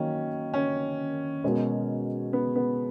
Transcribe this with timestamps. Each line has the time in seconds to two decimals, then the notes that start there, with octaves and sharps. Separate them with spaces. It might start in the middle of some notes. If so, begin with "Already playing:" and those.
Already playing: D#3 F#3 A#3 C#4
0.54 C#4
1.44 B2 G#3 C#4 F#4 A#4
2.33 B3
2.55 B3